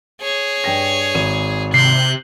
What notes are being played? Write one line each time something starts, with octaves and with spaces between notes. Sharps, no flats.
G#4 C#5
G2 G5 A#6
G#1 D#7
C3 F#6 G6 C7